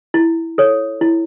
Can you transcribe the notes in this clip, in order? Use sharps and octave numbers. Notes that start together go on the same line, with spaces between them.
E4
A4 C#5
E4